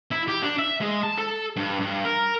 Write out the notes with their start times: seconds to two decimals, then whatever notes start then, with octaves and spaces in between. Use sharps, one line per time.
0.11 E4
0.28 G4
0.43 D4
0.59 E5
0.81 G#3
1.03 A5
1.18 A4
1.56 G2
1.80 G2
2.05 A#4